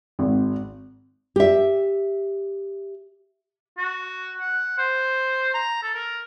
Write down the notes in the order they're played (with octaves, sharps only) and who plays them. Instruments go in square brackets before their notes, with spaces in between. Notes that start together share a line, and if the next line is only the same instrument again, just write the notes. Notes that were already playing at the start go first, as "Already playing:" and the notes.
[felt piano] G#1
[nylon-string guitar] G4 E5
[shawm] F#4
F#5
C5
A#5
A4
A#4